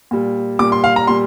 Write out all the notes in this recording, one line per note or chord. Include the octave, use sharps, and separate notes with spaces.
A#2 G3
A#2 G3 D6
C6
F5
A#5
A#2 G3 C6